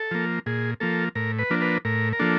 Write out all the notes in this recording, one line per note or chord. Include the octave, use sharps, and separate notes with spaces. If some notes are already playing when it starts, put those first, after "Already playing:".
Already playing: A4
F3 A#3
A#2 G#4
F3 A#3 A4
A2 A#4
B4
F3 A#3 D4
B4
A2 A#4
A#4
F3 A#3 D4 A4